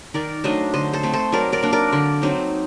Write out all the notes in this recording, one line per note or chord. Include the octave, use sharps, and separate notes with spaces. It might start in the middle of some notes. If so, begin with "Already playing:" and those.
D#3 A#4 D5
F#3 A3 D4 C5 D#5
D3 C5 D#5
A4 C5
A3 C4
A4 C5
F#3 A#4 D5
A#4 D5
A#3 D4
A#4 D5
D3
F#3 C4 D#4